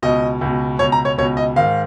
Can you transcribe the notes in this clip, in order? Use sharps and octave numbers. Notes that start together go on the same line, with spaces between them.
C#2 B2 D#5
C#2 B2
C#2 B2 C#5
A#5
C#5
C#2 B2 C#5
D#5
G#2 D#3 F5